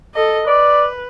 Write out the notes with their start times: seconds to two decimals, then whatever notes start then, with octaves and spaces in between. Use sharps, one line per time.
0.14 A4 D#5
0.47 B4 D5